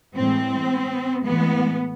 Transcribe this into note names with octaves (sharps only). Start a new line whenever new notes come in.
A2 E3 G#3 C4
A2 E3 G#3 B3